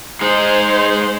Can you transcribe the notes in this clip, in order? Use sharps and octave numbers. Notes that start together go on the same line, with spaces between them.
G#3 D#4 C5